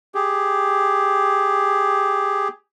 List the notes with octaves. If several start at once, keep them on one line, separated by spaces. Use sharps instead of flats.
G4 G#4